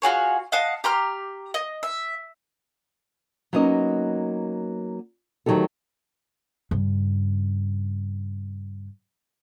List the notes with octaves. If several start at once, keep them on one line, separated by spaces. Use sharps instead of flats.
F4 F#4 G#4 C#5
D#5 F5 F#5 A5
G4 A#5 C6 F6
D#5
E5
F#3 A#3 B3 C#4 D#4 D#5
D2 D#3 F#3 D#4 G4 A4
G2 C#3